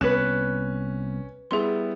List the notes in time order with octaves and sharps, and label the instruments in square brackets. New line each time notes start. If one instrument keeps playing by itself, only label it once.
[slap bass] C2 B3 [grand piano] C#4 E7 [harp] B4 F#6
[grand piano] G3 B3 E4 [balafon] G#4 C6